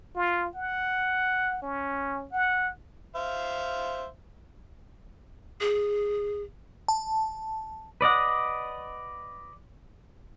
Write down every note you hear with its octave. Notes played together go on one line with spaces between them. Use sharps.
F4
F#5
C#4
F#5
C5 E5 F5
G#4
A5
B4 D5 D#5 F#5